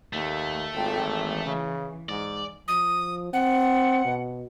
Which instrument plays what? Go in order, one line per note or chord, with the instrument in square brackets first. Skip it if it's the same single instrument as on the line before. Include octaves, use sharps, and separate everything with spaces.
[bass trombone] D#2 [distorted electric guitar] A3
[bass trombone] G#1 [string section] F4 A4 G5
[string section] E3
[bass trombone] C#3
[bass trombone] G#2 [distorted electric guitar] D5
[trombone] F3 [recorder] D#6
[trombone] C4 [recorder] F#5
[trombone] B2